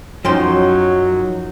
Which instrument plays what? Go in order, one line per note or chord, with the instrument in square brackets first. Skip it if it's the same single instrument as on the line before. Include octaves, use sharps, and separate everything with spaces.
[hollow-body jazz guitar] F#2 G5 C6 [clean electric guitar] F3 D#4 [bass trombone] F#3